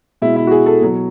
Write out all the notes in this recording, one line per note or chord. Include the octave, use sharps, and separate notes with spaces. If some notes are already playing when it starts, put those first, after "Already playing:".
B2 G#3 E4
E4
F#4
G#4
A4
B2 F#3